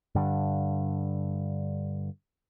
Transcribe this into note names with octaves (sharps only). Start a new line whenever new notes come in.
G2 D3